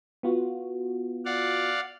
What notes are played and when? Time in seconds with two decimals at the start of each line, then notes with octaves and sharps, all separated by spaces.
0.23 B3 F4 F#4
1.25 D5 F5 F#5